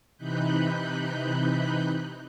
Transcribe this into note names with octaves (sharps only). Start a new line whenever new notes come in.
C3 E3 D#4 B5 F#6 G6